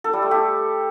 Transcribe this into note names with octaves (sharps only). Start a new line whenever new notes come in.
A4
G3
A3
G4